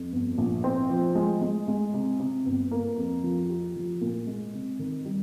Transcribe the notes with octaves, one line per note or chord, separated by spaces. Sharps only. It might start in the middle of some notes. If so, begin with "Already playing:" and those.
Already playing: F2
G1
A#1
C4
F3
G#3
G#3
G#3
C3
C3
G1
A#3
F2
F3
G4
F3
A#2
G#3
C3
D#3
G3